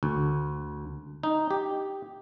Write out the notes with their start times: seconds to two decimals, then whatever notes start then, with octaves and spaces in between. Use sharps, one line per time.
0.03 D2
1.23 D#4
1.51 G4